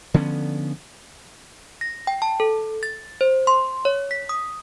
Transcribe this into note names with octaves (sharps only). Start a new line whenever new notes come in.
D3 F3 B3 C#4
A#6
G5
A5
A4
A6
C5
C6
C#5
B6
D#6